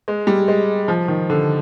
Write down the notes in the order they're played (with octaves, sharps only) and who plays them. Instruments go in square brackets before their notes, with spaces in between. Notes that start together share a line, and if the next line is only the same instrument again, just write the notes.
[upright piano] G#3
G3
G#3
F3
D#3
D3